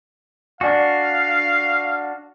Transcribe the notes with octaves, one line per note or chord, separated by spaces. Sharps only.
D4 F#4 D5 F5 G#5 D6